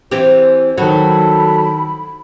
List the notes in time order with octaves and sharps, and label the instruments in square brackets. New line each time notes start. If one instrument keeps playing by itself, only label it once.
[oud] E3 C4 G4 [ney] C5
[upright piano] D#3 F#5 [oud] F#3 [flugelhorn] A4 [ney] B5